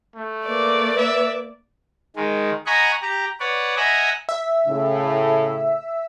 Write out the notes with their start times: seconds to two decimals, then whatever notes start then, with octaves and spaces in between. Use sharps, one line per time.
0.16 A3
0.46 A#3 B4 D5
0.97 E5
2.16 D#3 G#3
2.66 D#5 F#5 G#5 A#5 B5 C#6
3.02 G4 A#5
3.40 B4 C#5 D5 F#5
3.77 D#5 E5 F#5 G#5 A#5 B5
4.29 E5
4.67 A2 C#3